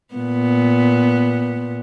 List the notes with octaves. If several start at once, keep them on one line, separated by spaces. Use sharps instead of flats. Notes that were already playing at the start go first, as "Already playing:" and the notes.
A#2 B3